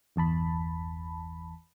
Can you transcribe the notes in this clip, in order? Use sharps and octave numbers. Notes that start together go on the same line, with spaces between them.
G1 E2 A5 B5